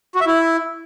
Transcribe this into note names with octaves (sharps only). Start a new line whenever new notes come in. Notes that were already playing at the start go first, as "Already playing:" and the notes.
F#4
E5
E4